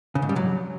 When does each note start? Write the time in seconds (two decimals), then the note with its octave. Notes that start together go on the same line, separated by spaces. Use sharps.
0.15 C#3
0.22 G#2
0.29 G3
0.36 F#3